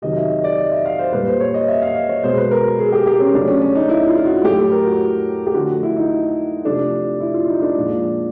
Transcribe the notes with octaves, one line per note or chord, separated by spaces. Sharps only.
C3 D#3 F#3 D#5
E5
D#5
D5
D#5
E5
F5
C5
A#2 G3 B4
C5
C#5
D#5
E5
F5
D#5
C#5
B2 G#3 C5
B4
A#4
G#4
G4
G4
C#4
C#3 F#3 A3 D4
C#4
C#4
D#4
E4
F4
F4
F#4
A2 F#3 A3 G4
A4
A#4
F#4
G4
D3 F3 A3 F#4
E4
D#4
C3 F3 A3 D4
E4
F4
D#4
D4
A#2 F3 G#3